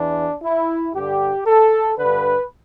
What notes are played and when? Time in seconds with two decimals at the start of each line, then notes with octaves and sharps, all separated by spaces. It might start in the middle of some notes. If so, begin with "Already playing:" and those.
Already playing: E2 E3 D4
0.43 E4
0.94 G2 D3 G4
1.46 A4
1.98 G2 D3 B4